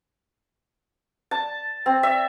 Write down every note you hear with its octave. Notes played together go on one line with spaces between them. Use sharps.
A5
C4
E5